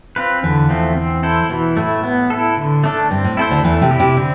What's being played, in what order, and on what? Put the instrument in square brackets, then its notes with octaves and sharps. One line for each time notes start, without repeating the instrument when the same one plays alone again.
[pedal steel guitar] C4 F4 B4
[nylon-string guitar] E2 E3 [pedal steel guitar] D3
[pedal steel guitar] F3 A3 C4
C4
E4 A4 C5
[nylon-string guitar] B2 [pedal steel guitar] E3
[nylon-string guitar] A2 [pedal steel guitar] A3 E4
[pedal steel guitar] B3
E4 A4
D3
A3 D4 A4
[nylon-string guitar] G2 [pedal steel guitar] C4
[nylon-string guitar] A2
[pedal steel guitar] E4 A4 C5
[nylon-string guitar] D2 D3
[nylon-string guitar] E2 E3 [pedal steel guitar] A3
[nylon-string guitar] C3
[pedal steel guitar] E4 G4
[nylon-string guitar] C3
[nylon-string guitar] D3 [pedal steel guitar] C4